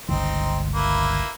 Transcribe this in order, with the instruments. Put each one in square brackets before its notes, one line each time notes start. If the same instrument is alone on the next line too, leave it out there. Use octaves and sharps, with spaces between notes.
[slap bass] G1 C#2 D#3 [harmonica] C4 D#4
[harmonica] A#3 E4 B4